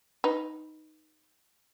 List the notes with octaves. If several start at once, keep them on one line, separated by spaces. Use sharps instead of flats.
D#4 B4